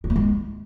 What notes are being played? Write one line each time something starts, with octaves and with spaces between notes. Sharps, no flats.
G3
A3
G#3